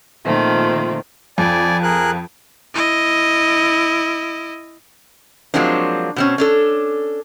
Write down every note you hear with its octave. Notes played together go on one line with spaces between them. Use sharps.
A#2 D#3 F3 A3 C4
F2 D5 G#5
G#4 A#4 F#6
E4 D#5
F3 F#3 G#3 A#3 C4 D4
B2 C4 C#4
C#4 D4 A4